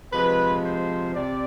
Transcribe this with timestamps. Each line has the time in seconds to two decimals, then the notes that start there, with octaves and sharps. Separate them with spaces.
0.11 C3 F3 G#3 B4
0.63 C5
1.14 C3 D5